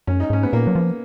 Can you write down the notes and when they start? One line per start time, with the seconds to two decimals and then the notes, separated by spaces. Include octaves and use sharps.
0.07 F#2 C#4
0.20 D#4
0.30 G#2 C#4
0.43 B3
0.53 A#2 A#3
0.67 F#3
0.75 F3